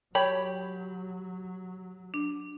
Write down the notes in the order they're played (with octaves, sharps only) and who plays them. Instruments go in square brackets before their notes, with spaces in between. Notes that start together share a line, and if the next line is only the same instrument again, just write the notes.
[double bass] F#3 [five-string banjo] G4 C#5 B5
[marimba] D4